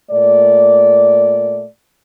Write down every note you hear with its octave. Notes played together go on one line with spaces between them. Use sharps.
A#2 A3 D5